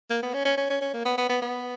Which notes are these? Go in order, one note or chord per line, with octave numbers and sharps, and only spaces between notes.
A#3
B3
C#4
C#4
C#4
C#4
C#4
A#3
B3
B3
B3
B3